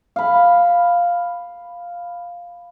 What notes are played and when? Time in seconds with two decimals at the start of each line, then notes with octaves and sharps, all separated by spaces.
0.16 F5 B5